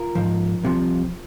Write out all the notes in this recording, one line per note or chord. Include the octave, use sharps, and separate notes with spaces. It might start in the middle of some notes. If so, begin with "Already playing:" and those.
Already playing: F4 A#4
G#2 F3
C2 C3 F3